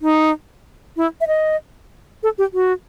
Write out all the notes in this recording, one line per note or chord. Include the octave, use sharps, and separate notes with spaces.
D#4
E4
E5
D#5
A4
G4
F#4